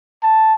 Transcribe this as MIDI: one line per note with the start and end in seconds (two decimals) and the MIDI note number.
0.23 0.54 81